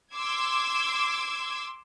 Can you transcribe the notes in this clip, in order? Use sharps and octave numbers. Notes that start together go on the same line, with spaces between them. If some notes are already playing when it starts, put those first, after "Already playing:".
C6 D6 E6 G#6